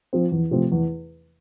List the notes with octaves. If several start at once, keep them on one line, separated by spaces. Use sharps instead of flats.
F3 C4
E2
C3 F3 A3 C4
E2